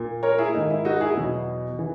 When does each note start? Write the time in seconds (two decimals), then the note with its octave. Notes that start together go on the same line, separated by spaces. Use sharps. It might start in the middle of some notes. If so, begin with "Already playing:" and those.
Already playing: A#2 A#3
0.23 A#4 C#5
0.38 E4 G#4
0.54 G#2 D#3 A#3 D#4
0.70 E4
0.85 D#4 F#4
1.01 E4 G#4
1.16 E2 B2 F#3
1.79 E3